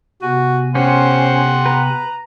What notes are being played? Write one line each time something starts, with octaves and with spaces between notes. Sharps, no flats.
C3 B3 F#4 G#5
C#4 G4 C5 F#5 C6
B4 A#5